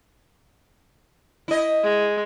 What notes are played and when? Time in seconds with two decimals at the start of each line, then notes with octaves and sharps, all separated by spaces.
1.48 E4 D#5
1.83 G#3